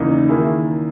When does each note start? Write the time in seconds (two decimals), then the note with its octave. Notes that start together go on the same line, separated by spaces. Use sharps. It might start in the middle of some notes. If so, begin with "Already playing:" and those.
Already playing: E2 C#3 E3 A#3 D#4
0.29 D#3 A#3 E4 G#4